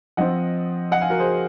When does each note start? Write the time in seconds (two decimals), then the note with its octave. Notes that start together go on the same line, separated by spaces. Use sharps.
0.17 F3 C4 D#5 F#5
0.91 D#5 F#5
1.01 F5 G#5
1.10 F#4 A#4
1.19 G#4 C5